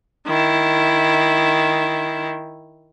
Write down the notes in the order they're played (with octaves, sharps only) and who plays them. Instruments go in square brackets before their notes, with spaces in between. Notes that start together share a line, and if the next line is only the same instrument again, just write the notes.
[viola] D#3 E4